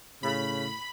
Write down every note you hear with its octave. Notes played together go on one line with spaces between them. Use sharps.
A2 C#3 B5